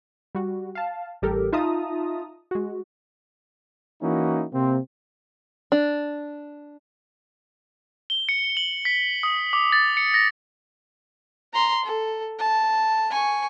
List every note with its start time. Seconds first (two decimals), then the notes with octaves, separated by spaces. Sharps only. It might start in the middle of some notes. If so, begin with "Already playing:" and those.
0.35 G3 F#4
0.75 F5 A5
1.22 A1 G3 G4 A4 A#4
1.53 D#4 F4 E5 A5 A#5 D#6
2.51 G#3 F#4
4.02 E3 A#3 C#4 D#4 E4 F#4
4.53 C3 A#3 C4
5.72 D4
8.10 G7
8.29 C#7
8.57 F#7
8.85 B6
9.23 D#6
9.53 D6
9.72 A6
9.97 C#7
10.14 A#6
11.53 A#5 C6
11.85 A4
12.39 A5
13.11 G#5 C#6